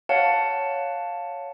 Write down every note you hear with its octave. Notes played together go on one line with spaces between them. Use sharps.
C#5 F5 F#5 A5